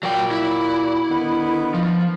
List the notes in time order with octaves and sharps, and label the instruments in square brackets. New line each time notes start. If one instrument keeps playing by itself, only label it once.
[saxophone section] A#2 F#4 D5 [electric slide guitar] F#3 G5
[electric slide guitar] E4
[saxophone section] D3 D#3 B3
[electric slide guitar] F3